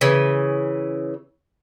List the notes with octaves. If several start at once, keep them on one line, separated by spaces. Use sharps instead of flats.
C#3 E3